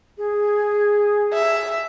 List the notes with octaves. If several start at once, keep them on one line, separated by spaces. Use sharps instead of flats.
G#4
E5